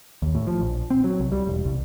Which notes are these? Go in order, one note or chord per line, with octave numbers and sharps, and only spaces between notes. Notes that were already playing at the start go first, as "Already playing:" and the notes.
D#2
A2
F3
A#1
C4
F#3
C2
G3
E1
C2